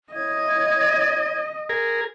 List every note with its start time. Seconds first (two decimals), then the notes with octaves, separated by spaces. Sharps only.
0.13 E4 C#5 D#5 G#6
1.69 G#4 A#4